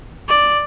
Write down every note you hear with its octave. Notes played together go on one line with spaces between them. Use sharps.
D5